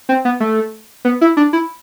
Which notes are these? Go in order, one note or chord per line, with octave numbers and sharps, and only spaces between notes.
C4
B3
A3
B3
E4
D4
E4